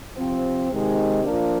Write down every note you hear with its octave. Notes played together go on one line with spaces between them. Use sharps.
C3 F3 C4
C3 D#3 G#3 D#4
F3 A#3 D4